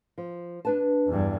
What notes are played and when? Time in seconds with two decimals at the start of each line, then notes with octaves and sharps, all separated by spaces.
0.18 F3
0.65 D4 B4 A5
1.07 E2 G2